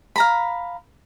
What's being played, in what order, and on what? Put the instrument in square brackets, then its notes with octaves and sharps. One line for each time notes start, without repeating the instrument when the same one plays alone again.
[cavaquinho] F5 A#5 B5